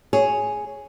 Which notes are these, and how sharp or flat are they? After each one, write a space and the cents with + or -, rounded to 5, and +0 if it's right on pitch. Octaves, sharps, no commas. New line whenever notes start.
G#4 +5 C#5 +0